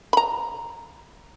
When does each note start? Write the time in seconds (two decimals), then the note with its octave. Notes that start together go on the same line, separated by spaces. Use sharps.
0.13 A#5 B5